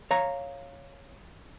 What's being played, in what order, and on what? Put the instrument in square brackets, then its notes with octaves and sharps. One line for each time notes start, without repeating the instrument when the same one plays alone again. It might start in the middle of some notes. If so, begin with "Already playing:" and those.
[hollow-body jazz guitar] C#5 F5 A#5